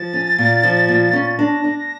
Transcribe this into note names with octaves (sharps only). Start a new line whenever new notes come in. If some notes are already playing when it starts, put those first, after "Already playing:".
Already playing: F3 A6
C#4
A#2
F3
A#2
C#4
D4 A#6
D4